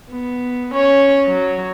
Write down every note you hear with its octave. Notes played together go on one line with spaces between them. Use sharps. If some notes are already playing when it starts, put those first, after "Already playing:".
B3
C#4 C#5
F#3